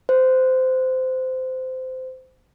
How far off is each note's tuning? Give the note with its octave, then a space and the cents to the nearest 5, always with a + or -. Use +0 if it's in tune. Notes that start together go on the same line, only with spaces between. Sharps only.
C5 -20